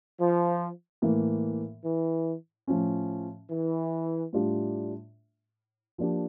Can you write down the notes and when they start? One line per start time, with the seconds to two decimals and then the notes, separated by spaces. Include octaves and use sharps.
0.20 F3
1.02 A2 E3 A#3
1.84 E3
2.67 A2 F3 C#4
3.51 E3
4.33 A2 G3 D4 F4
5.98 F3 A#3 D4 G4